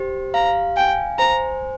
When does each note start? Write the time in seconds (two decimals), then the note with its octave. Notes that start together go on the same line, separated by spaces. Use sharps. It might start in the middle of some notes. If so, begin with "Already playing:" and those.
Already playing: G4 C5
0.34 F5 A#5
0.77 G5 G#5
1.19 C5 A#5